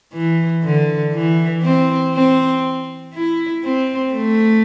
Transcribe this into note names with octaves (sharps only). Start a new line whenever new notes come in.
E3
D3
E3
C4
C4
E4
C4
A3